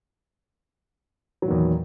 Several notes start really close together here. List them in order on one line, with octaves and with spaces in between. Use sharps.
F#3 A#2 D#3 E2